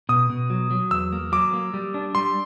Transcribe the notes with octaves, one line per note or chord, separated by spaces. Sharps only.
B2 D#6
B2
F#3
F#3
E2 E6
A#3
F#3 D6
A#3
G3
D4
G3 C6